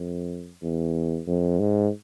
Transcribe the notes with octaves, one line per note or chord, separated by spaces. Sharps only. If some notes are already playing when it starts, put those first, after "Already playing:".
Already playing: F2
E2
F2
G#2